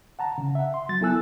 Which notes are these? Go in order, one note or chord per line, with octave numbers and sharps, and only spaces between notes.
F#5 A5 A#5
C#3
E5 F#5
C6
F#3 A6
B3 E4 A4 G#5 E6 F#6